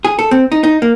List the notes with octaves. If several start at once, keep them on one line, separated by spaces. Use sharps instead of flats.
G#4
A4
C4
D#4
D#4
A#3